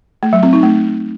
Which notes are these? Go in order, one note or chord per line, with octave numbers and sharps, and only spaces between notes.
A3
F#3
C4
D#4
A3